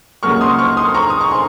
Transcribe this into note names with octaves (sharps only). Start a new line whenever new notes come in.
C#2 C#3 F#3 A#3 C#6 F6
C6 D#6
C#6 F6
C6 D#6
C6
A#5 C#6
D#6
C#6
G#5 C6